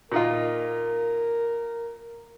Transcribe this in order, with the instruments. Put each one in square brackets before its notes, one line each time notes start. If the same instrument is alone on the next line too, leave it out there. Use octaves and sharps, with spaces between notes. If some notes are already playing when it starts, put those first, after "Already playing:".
[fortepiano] A#2 D#4 F4 [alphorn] A#4